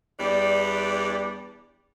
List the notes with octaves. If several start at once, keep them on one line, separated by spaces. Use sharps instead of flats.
E2 G3 D4 D5